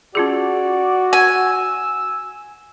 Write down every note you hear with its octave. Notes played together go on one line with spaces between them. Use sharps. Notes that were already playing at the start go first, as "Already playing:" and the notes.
C#4 F4 F#4 G#4 D5
G#5 E6